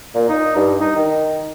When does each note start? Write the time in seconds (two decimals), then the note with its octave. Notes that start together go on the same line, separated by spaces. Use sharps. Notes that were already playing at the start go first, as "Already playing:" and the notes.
0.15 A#2
0.29 D#4
0.56 G2
0.81 D#4
0.96 D#3